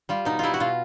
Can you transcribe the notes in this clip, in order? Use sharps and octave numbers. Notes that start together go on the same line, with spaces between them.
G3 F4
B2 D#4
G3 E4 F4
F#4
B2 F4